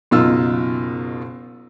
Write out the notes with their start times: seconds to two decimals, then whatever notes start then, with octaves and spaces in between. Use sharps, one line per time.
0.11 F#1 B2 D#4 F4 E6